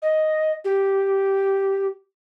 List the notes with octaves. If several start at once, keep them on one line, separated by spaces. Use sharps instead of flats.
D#5
G4